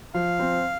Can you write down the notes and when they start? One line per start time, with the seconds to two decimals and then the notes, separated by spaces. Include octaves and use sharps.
0.14 F3 F5
0.39 C4